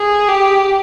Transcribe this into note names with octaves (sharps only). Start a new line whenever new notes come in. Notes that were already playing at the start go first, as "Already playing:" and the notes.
Already playing: G#4
G4